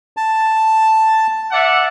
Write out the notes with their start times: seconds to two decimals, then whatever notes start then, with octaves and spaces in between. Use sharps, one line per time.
0.17 A5
1.51 D5 E5 F#5